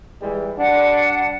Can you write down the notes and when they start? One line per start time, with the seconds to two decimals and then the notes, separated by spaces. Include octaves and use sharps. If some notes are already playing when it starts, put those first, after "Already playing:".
0.20 E3 G3 G#3
0.57 G3 D4 F#5